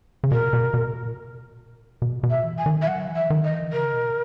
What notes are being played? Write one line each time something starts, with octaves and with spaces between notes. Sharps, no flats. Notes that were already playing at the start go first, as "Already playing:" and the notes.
C#3
B2 A#4
B2
B2
A#2
B2
B2
E5
E3
G#5
D#3
E5
F#3 F#5
E3
E5
D#3
D#5
E3
C#3 A#4
B2